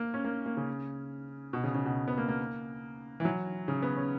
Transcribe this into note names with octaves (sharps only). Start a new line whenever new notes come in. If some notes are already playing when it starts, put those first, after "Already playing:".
Already playing: A#3
C#4
A#3
A#3
C#3
B2
C#3
C#3
B2
B3
A#3
A#3
E3
F#3
C#3
B3
C#4